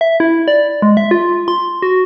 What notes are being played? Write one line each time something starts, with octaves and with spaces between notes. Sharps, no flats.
E5
E4
D5
G#3
E5
F4
C6
F#4